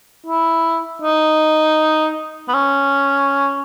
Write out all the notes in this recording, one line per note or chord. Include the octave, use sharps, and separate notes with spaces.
E4
D#4
B3
C#4